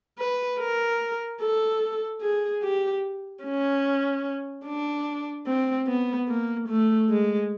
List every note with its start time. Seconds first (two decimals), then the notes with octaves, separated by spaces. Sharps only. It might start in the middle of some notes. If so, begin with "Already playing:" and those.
0.19 B4
0.59 A#4
1.41 A4
2.21 G#4
2.63 G4
3.44 C#4
4.66 D4
5.47 C4
5.87 B3
6.29 A#3
6.69 A3
7.09 G#3